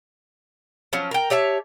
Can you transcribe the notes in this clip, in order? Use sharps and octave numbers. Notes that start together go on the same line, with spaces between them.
F3 F#3 C#4
A#4 G5
G4 C#5 E5 A5